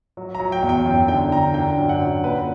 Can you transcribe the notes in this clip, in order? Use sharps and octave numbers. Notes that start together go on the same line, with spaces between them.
F#3
A#5
F#3
G5
E2
G5
F#2
D3 G5
D3 A#5
D3 G5
F#2
F#5
F#2
A#2 B4